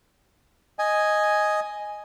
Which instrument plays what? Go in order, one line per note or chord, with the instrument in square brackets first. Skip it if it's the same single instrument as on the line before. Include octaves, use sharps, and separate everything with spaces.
[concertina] D#5 G#5